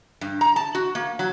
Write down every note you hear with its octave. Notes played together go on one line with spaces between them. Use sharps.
G2
A#5
A5
F#4
A#3
F#3